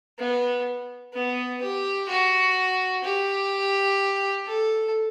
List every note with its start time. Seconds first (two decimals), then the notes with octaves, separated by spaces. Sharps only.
0.18 B3
1.13 B3
1.62 G4
2.09 F#4
3.04 G4
4.47 A4